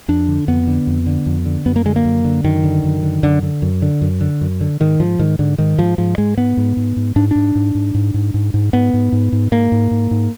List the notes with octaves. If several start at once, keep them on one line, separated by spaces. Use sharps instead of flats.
F2 D4
D3
F2 B3
D3
F2
D3
F2
D3
F#2 B3
A#3
D3 G#3
A#3
F#2
D3
F#2 D#3
D3
F#2
D3
F#2 D3
D3
F#2
D3
F#2
D3
F#2
D3
G#2 D#3
G#2 F3
G#2 D#3
G#2 D3
G#2 D#3
G#2 F3
G#2 F3
G#2 G#3
G#2 B3
G#2
G#2
G#2
G#2 D4
G#2 D4
G#2
G#2
G#2
G#2
G#2
G#2
G#2 B3
G#2
G#2
G#2
G#2 A#3
G#2
G#2
G#2